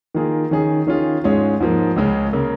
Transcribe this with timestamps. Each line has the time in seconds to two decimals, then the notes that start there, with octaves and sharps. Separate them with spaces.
0.15 D#3 A#3 F4 G#4
0.51 D#3 C#4 G#4
0.87 D#3 C#4 F4 G#4
1.24 G#2 G#3 C#4 F4 G#4
1.60 G#2 F3 A#3
1.96 C#2 C#3 G#3 C#4
2.33 C#3 A#3